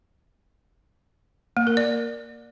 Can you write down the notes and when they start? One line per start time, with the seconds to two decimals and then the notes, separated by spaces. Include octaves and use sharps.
1.57 A#3
1.67 A#4
1.77 D5